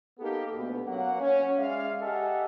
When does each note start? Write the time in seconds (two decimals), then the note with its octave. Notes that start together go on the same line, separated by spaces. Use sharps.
0.19 A#3 B3 D#4 G4 A4
0.54 D2 B2 B3
0.86 F#3 A#3 C#4 F#5
1.20 C#4
1.57 G#3 D5 E5 F5
2.01 G4 A4 D#5 E5 F#5 G#5